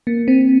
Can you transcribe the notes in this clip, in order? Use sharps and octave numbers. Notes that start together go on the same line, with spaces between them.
A#3
C4